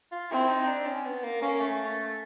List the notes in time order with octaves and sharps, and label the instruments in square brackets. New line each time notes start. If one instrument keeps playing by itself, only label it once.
[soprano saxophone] F4
[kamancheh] C4 [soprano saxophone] E4
[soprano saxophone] D#4
D4
C#4
B3
A#3
[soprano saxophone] A#3 [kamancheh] C#4
[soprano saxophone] A3